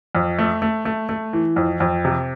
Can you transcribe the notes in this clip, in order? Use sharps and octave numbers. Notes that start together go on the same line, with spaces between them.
F2
A3
A3
A3
A3
E3
F2
F2
C3